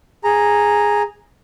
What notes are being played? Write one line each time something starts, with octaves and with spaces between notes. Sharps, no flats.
G#4 A#5